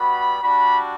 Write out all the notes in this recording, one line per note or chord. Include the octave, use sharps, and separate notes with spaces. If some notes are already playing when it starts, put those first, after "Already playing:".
Already playing: G3 B3 F#4 B5
G3 D4 F#4 B5